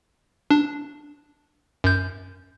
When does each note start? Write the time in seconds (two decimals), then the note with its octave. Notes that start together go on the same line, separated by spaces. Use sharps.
0.51 D4
1.84 F#2 G6